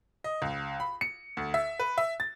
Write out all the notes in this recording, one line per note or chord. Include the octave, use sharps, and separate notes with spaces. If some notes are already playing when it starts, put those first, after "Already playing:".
D#5
C#2
B5
C#7
D2
E5
B4
E5
A6